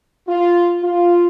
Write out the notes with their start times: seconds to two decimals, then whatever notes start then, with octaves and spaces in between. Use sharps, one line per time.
0.27 F4
0.82 F4